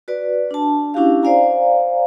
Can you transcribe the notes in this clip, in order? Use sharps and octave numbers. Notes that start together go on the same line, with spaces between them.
F#4 B4 D5
D4 A5
C#4 D4 E4 F#4 G4 F5
C5 D5 F5 G#5 A#5